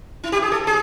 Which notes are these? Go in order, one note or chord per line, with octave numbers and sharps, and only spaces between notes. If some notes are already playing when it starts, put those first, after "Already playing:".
E4
G4
G#4
A4
G#4